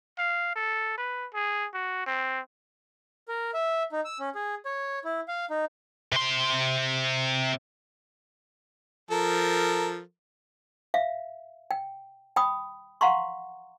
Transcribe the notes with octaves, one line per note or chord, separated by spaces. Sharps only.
F5
A4
B4
G#4
F#4
C4
A#4
E5
D#4
E6
C#4
G#4
C#5
E4
F5
D#4
C3 C6
F3 A4 A#4
E5 F5
G5
G5 B5 D#6
F5 F#5 A#5 C6 C#6